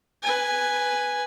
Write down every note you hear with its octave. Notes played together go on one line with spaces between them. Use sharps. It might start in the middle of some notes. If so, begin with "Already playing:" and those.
B4 G#5